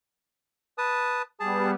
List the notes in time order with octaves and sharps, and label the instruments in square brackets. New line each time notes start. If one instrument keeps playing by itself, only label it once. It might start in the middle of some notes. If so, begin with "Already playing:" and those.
[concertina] B4 A5 D#6
[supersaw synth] G3 B3 [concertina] G#4 A5